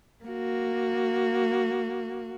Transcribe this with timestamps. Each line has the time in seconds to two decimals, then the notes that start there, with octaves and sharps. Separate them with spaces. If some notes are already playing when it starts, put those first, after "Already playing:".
0.24 A#3 F#4